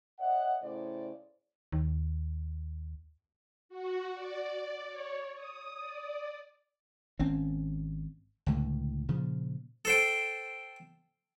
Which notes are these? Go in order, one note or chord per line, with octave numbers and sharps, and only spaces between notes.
C#5 D#5 E5 F#5
A2 C#3 C5 D5
D#2
F#4
D5
C#5
D#6
D5
G#1 C4 C#4
C#2 A2 D3
A#2 C#3 F3
A4 C5 G5